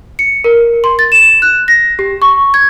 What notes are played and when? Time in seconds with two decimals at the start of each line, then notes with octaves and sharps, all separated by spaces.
0.19 C#7
0.44 A#4
0.84 C6
0.99 A6
1.12 E7
1.42 F#6
1.68 A#6
1.99 G4
2.22 C#6
2.54 G#6